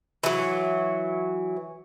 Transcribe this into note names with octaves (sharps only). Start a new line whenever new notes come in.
E3 F#3